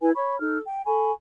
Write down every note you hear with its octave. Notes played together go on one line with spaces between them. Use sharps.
E4 B4 G#5
C#5 B5 C#6
D#4 A4 F6
G5
A4 G#5 B5 C#6